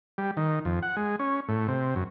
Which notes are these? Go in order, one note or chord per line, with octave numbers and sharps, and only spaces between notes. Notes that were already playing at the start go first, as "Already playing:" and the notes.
G3
D#3
F2
F#5
G#3
C#4
A2
C3
F#2